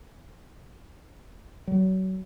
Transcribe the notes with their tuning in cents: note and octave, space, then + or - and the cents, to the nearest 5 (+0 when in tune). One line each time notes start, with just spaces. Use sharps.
F#3 +30